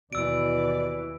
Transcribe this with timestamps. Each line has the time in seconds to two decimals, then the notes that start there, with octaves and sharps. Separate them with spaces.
0.13 D#2 B2 E3 D5 E6 D7